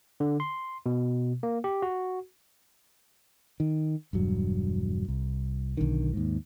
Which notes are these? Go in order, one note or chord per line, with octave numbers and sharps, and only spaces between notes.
D3
C6
B2
A#3
G4
F#4
D#3
E1 G2 F#3
C2
B1 D3 D#3
D#2 G#2